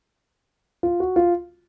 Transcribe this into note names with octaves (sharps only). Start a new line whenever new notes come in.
F4
F#4
F4